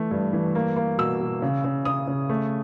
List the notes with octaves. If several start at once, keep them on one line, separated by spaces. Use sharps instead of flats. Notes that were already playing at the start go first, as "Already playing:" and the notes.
Already playing: E3 A3
G2
E3
A#3
A#3
B2 E6
B2
C#3
C#3
C#3 D#6
C#3
A3